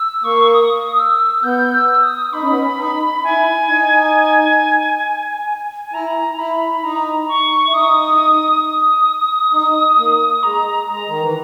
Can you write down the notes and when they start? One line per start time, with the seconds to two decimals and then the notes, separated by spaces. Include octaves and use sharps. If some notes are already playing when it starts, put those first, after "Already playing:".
Already playing: E6
0.24 A#3 C#6
0.53 D#6
0.99 E6
1.44 B3 G6
1.74 E6
2.03 D#6
2.33 D#4 B5
2.42 C#4
2.50 B3
2.59 C#4
2.78 D#4
3.24 E4 G#5
3.69 D#4
5.86 G#5
5.94 E4 A#5
6.38 E4 B5
6.84 D#4 A#5
7.29 C#6
7.67 E4
7.74 D#4 D#6
8.63 D#6
9.53 D#4
9.98 A#3
10.43 G#3 A#5
10.88 G#3 A#5
11.08 D#3
11.21 E3